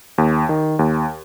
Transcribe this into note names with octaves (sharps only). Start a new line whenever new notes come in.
D#2
D#3
D#2